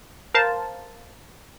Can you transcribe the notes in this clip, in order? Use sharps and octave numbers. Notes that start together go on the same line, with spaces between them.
A#4 C5 F5 A5